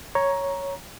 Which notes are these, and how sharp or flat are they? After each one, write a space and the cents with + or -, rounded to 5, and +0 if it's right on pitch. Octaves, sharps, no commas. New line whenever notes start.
C#5 +0 A#5 +10